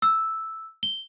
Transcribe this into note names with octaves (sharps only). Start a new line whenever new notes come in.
E6
G7